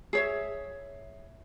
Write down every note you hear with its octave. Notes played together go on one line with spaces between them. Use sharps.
G#4 C#5 E5